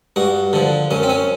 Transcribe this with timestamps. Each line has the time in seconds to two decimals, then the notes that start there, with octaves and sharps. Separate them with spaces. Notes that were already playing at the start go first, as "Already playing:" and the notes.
0.16 G2 F#4
0.53 D3 F3
0.91 F#2 C#4
1.03 C4
1.10 C#4